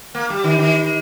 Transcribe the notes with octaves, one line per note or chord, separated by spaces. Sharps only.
A#3
G3
D#3
D#3